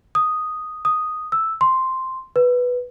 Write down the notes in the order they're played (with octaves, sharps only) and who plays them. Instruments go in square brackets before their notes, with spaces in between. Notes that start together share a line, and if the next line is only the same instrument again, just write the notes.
[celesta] D#6
D#6
E6
C6
B4